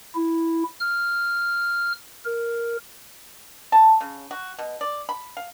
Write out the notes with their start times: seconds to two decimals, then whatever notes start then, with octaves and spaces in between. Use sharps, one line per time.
0.15 E4
0.80 F6
2.25 A#4
3.72 A5
4.01 C#3
4.31 F#4
4.59 B2
4.81 D5
5.09 B5
5.37 F5